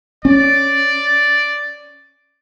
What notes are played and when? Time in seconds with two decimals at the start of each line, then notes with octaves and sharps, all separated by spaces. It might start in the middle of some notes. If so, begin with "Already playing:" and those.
0.25 C#4 D5